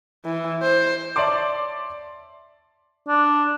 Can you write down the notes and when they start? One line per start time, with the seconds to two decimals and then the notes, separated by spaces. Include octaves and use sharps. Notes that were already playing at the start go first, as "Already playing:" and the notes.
0.25 E3
0.62 C5
1.16 C#5 D5 E5 A5 C6 D6
3.08 D4